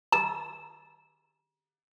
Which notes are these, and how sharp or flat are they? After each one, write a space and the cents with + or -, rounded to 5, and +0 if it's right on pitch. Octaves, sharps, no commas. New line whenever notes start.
A#5 +40